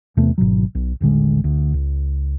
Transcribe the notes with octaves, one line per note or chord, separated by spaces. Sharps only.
E2 C3 A3 B3
G#1 G#2 B2 F#3
B1
D#1 A1 D3 G#3
D2
C#2